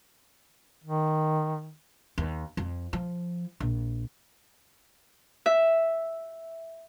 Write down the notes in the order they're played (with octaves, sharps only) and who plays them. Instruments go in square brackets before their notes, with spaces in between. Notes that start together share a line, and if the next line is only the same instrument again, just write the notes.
[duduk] D#3
[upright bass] D#2
F2
F3
A#1
[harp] E5